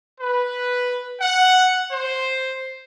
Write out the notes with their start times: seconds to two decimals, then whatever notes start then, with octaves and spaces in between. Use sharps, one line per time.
0.21 B4
1.21 F#5
1.92 C5